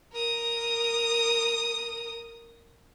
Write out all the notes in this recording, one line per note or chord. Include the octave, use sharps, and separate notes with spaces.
A#4 D#6